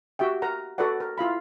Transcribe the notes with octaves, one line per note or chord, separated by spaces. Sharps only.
F#4 G4 E5 G5
A#4 F#5 A#5
F#4 A4 B4 D5 F#5
A#4
E4 F4 F5 B5